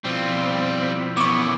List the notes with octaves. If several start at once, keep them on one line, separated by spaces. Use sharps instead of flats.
B2 F3 G3 C4 E4 F4
F#2 E3 B3 C#6 D6